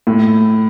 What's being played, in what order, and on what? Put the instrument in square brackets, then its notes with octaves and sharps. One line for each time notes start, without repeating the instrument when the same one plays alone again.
[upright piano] A2